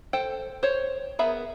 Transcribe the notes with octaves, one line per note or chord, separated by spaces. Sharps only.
A4 C5 G5
C5 C#5
B3 G#4 A#4 E5 B5